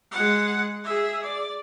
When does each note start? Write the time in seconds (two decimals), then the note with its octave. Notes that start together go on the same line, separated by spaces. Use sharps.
0.11 G#3 F#5
0.84 G#4 E5
1.22 D5